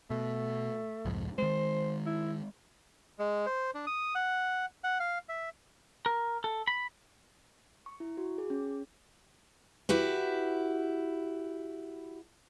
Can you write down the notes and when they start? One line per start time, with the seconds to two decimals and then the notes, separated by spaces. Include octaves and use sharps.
0.10 B2 A3
1.05 C2 F2 G#2
1.38 D#3 G#3 C5
2.06 E4
3.19 G#3
3.46 C5
3.74 D4
3.87 D#6
4.15 F#5
4.84 F#5
5.00 F5
5.29 E5
6.06 A#4
6.44 A4
6.67 B5
7.86 C#6
8.00 E4
8.17 F#4
8.38 G#4
8.50 C#4
9.89 E4 F#4 G4 B4